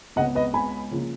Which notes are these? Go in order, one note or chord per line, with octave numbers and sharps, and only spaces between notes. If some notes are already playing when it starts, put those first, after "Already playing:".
C#2 C#3 G#3 B3 D#5 F#5
B4 D#5
G#5 B5
C#3 F3 A#3